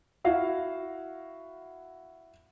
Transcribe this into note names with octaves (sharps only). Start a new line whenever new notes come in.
E4 F#4 F5